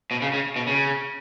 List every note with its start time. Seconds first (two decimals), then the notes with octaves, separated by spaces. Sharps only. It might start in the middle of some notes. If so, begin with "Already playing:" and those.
0.11 B2
0.22 C#3
0.34 C#3
0.56 B2
0.67 C#3